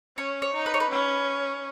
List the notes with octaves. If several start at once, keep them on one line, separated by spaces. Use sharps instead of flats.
C#4 C#5
C#5
D#4
B4
C#5
B4
C#4